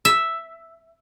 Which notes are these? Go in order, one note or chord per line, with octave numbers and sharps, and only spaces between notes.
E5